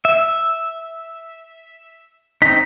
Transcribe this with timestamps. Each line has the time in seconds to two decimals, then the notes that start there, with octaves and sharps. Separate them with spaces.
0.05 E5
2.42 C4 D#4 B6